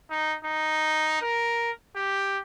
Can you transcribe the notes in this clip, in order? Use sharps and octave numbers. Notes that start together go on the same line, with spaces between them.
D#4
D#4
A#4
G4